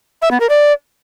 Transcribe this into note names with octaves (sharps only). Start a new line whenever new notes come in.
E5
B3
A#4
D5